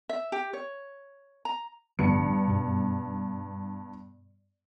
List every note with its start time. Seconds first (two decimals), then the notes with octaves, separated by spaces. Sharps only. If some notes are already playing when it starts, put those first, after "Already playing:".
0.09 E5
0.32 G4
0.53 C#5
1.45 A#5
1.99 A1 G2 D3 F3 B3 C#7
2.47 F#2 B2